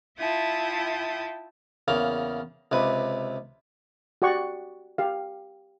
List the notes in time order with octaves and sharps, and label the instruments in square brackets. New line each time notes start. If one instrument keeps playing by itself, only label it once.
[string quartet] E4 F4 E5 G5 A5 D#6
[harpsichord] E2 C#3 A#3 A#5
C#2 C3 B4
[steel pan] F#4 G4 D5 F#5 C#6
G4 F5